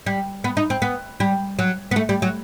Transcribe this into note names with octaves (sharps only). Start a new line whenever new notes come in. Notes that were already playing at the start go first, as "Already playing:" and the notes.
G3
B3
D#4
C4
B3
G3
F#3
B3
A3
G3
F#3